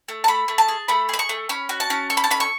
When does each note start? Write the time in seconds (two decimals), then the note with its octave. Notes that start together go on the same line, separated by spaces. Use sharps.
0.08 A3
0.24 A5
0.28 A3 B5
0.48 A3
0.58 A5
0.68 G#4
0.88 A3 B5
1.09 G#4 B5
1.19 C#6
1.29 A3
1.49 C#4 B5
1.69 F#4
1.80 A5
1.90 C#4
2.10 A4 C#6
2.17 B5
2.24 A5
2.31 C#4 B5
2.40 C#6